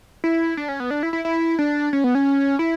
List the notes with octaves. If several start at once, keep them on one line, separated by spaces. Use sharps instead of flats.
E4
D4
C#4
B3
D4
E4
E4
E4
D4
C#4
B3
C#4
E4